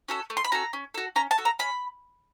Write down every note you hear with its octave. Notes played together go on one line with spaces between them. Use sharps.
C#4 F#4 A4
A3
C6
B5
C#4 F#4 A4 A#5
C#4
F#4 A4
C#4 A#5
A5
F#4 A4
A#5
C#4 B5